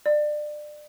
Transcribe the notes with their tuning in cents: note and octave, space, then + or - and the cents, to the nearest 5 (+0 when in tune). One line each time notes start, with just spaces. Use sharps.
D5 +25